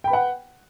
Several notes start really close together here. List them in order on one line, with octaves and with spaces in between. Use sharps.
G5 B5 B4 F#5